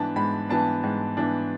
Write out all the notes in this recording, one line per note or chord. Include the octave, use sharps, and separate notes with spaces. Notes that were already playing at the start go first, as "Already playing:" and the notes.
Already playing: G#2 E3 B3 D4 A5
G#2 B5
E3 B3 D4 A5
G#2
E3 B3 D4